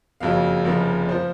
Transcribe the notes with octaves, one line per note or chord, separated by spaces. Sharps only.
F#1 F2 C#3 F#3 F5
F1 F2 C#3 F3 A#4
F3 C5